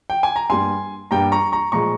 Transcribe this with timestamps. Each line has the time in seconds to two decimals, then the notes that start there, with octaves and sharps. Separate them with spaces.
0.10 G5
0.23 G#5
0.36 A#5
0.50 G2 G3 A#3 G#5 C6
1.11 G2 G3 A#3 G5 A#5
1.32 A#5 C#6
1.52 A#5 C#6
1.72 A#2 F3 G#3 A#5 C#6